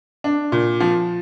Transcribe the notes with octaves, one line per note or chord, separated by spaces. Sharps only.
D4
A#2
F3